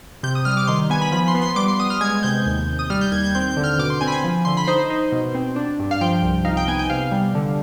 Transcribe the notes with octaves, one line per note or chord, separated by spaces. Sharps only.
C3 G6
D#6
G3 F6
D6
D#3 C6
B3 G#5
B5
F3 B5
C6
B3
C6
G3 D6
C6
B3 D#6
F6
G#3 G#6
C3 G6
D#2
D#2
D#6
G3 F6
G6
D#2 G#6
G6
C4 G6
G6
D3
F6
B2 D6
C6
C4 G#5
B5
G#5
F3
D3 C6
B5
D#4 C5
D#4
B2
C4
D4
G2
F5
F3 G5
C2
D#4 F5
G5
B3 G#5
G5
C3 F5
G3
D3